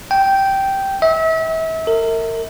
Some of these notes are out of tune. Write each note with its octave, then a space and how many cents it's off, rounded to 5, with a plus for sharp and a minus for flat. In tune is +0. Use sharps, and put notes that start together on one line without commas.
G5 -10
E5 -35
A#4 -35